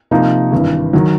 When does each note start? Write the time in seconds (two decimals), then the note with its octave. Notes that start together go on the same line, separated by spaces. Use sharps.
0.11 C3 F3 A#3 D#4
0.52 G#1 G2 E3
0.93 D#3 F#3